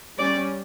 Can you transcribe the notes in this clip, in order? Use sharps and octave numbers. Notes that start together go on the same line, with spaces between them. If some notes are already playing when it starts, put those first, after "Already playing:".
G3 C#4 D5